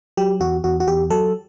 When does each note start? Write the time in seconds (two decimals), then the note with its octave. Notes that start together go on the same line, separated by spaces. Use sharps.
0.17 F#3 G4
0.40 E2 F#4
0.64 E2 F#4
0.80 F#4
0.87 E2 G4
1.10 F#3 A4